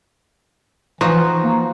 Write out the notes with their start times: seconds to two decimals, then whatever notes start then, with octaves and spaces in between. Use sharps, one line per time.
1.01 E3 F3 D#4 F#4
1.44 A#3